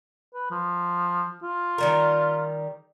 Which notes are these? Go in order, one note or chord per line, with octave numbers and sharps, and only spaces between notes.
B4
F3
F4
D#3 G3 A#4